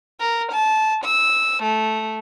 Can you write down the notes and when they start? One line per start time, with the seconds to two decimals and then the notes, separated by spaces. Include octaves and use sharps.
0.20 A#4
0.52 A5
1.04 E6
1.63 A3